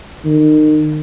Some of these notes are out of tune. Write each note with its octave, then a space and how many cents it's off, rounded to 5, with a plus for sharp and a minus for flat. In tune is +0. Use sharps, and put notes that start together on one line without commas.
D#3 -30